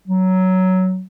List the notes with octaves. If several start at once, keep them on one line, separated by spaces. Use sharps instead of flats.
F#3